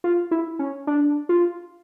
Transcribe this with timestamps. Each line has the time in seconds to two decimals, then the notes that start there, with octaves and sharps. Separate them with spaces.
0.04 F4
0.31 E4
0.59 C#4
0.87 D4
1.29 F4